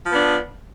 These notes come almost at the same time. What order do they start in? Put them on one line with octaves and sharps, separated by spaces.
F3 B3 D4